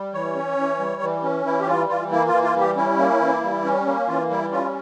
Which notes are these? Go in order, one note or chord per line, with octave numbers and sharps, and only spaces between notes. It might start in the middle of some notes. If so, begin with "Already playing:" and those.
Already playing: G3
E3 C#5
C#4
E3
G3
E3
C#4
E3 E4
G4
G3 F4
E3 F4
A#3 E4
E3 F4
F4
G3 G4
C#4 E4
A#3
E3
G3
C#4
A#3
E3 F4
G3 E4
C#4 F4